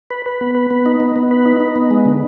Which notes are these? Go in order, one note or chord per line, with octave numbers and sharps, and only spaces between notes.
B4
B4
B3
B4
B3
D#4
B3
B3
B4
D#4
D#4
B3
G#3
D3